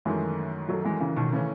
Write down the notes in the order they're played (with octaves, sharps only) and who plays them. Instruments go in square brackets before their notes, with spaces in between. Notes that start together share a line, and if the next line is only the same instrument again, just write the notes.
[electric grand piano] F#2 D#3 A3 [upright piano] E3 G#3
[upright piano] F#3 A3
E3 G#3
C#3 E3
B2 D#3
[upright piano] C#3 [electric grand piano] E3 A3 C#4